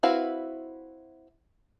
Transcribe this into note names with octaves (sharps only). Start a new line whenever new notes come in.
C4 E4 F#4 B4 F5